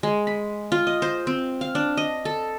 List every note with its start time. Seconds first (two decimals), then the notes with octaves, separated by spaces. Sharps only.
0.03 G#3
0.27 B5
0.72 F4
0.87 D#5
1.02 C5
1.27 C4
1.61 F5
1.75 D4
1.97 D#5
2.25 A4